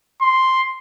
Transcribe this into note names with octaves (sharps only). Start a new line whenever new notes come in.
C6